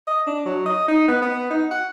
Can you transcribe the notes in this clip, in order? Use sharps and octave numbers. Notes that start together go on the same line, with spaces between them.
D#5
D4
F#3
D#5
D#4
B3
B3
D#4
F#5